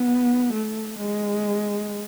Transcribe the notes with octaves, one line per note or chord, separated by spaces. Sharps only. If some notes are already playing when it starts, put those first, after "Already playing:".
Already playing: B3
A3
G#3